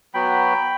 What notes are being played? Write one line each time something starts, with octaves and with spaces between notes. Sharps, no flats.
F#3 B3 F#4 G5 B5